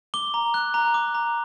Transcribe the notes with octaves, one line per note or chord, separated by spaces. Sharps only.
D6 G7
A#5
F#6
A#5
D6
A#5